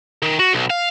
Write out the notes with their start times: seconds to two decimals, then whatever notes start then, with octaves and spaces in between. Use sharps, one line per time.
0.23 D#3
0.39 F#4
0.53 B1
0.70 F5